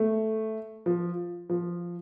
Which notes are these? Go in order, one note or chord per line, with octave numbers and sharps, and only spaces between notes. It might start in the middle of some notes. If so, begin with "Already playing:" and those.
Already playing: A3
F3
F3